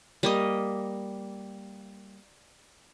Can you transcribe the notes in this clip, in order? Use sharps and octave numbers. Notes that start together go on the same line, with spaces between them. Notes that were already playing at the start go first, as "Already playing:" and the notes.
G3 A#3 D#5